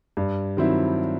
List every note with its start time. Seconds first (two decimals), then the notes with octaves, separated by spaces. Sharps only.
0.17 G2
0.57 D#3 F#3 C4 E4